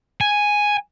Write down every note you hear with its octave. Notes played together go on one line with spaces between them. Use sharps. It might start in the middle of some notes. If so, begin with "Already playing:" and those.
G#5